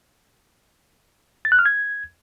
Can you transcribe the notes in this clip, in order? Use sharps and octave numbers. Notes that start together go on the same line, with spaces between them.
A6
F#6
F6
G#6